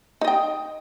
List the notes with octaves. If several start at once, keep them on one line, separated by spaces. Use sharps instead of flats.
D#4 D#5 G5